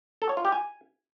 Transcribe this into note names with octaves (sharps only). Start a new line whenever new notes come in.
A4
C#5
F4
G4
G#5